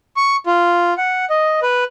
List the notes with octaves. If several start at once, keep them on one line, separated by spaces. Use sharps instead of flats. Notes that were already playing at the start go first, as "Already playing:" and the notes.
C#6
F4
F#5
D#5
B4